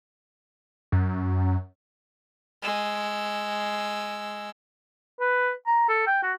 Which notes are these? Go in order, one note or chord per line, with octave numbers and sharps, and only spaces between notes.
F#2
G#3 E6
B4
A#5
A4
G5
F#4